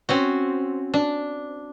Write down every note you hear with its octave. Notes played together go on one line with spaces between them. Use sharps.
C4 C#4 F#4
D4